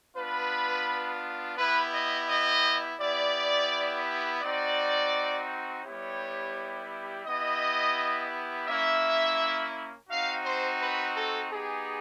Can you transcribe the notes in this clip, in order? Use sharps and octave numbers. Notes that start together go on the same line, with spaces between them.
B3 D4 F4 B4
B3 E4 G4 B4
D#5
D#5
B3 E4 G4 D5
C4 D#4 F#4 D5
G3 B3 E4 G4 C#5
B3 E4 G4 D#5
A#3 C#4 E4 E5
C4 D#4 F#4 F5
C5
B4
A4
B3 D#4 G4 G#4